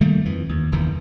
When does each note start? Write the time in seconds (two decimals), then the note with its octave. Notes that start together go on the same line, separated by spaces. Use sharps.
0.01 D#3 G3 A3 A#3
0.25 F2 E3
0.49 D#2
0.72 F#1 E2 D#3 E3